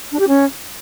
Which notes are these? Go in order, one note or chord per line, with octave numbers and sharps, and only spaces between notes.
D4
G4
C#4